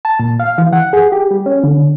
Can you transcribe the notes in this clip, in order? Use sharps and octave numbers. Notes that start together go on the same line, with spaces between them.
A5
A#2
F5
E3
F#5
G#4
G4
G3
C#4
D3